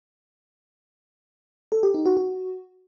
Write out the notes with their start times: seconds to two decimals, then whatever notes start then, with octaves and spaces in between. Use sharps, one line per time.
1.72 A4
1.83 G4
1.94 D#4
2.06 F#4
2.17 F#4